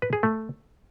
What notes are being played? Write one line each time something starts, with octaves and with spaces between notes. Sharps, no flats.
B4
G#4
A3